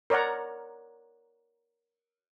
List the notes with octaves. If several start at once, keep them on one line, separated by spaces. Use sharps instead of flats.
A#4 C#5 D5 F#5 A#5